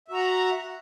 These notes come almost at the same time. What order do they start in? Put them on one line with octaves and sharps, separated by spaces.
E5 F#4 A#5 F#5